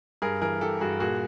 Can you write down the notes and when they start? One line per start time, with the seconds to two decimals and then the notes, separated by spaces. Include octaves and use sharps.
0.22 G2 G#4 A#4
0.41 E3 G#4 A#4
0.61 E3 G4 A4
0.81 G2 F#4 G#4
1.00 A#2 F#4 G#4